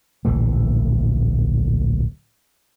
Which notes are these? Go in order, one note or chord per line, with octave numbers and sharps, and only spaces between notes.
D1 A#1 E3 A3